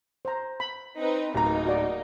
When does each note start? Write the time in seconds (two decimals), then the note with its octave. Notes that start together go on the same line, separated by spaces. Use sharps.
0.25 C5 A#5
0.60 B5
0.98 C4 D#4 B4
1.34 D1 A#3 D#4 A#5
1.67 F#4 D5